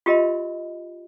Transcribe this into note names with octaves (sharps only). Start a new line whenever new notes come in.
F4 G4 A#4 D#5 E5 B5